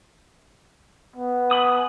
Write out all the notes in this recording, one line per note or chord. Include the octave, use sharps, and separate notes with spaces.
B3
G#5 B5 D#6